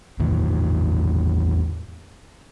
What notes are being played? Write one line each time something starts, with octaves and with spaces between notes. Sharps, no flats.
E2 A2 D#3